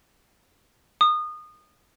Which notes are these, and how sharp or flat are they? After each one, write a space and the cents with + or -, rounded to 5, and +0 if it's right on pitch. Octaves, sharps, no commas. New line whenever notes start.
D#6 -25